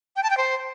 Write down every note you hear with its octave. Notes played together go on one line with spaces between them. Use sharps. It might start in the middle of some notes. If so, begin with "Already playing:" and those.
G5
A5
G5
C5